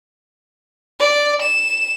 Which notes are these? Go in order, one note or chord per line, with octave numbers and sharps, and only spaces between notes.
D5
E7